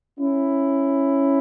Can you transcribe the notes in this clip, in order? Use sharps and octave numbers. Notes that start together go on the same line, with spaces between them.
C#4 E4